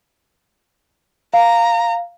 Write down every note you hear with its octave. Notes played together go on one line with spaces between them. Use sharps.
F5 A#5